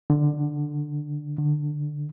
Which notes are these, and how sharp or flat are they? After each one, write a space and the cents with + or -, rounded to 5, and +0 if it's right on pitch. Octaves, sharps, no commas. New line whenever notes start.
D3 +10
D3 +15